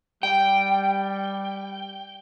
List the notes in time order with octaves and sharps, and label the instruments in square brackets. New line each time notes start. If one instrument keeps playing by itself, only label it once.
[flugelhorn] G3 [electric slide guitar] G5